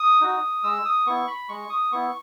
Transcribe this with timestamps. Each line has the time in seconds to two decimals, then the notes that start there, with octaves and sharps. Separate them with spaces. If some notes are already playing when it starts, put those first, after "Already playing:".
Already playing: D#6
0.21 D#4 F#4
0.63 G#3 E6
0.85 D#6
1.07 B3 E4 C#6
1.27 B5
1.49 G#3 C#6
1.70 D#6
1.92 B3 E4 C#6